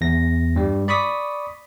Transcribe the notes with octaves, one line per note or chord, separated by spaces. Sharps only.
E2 A#6
G2 G3
D5 B5 C#6 D#6 B6